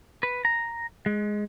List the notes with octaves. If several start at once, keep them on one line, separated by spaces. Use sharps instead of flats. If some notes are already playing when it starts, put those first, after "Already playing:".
B4
A#5
G#3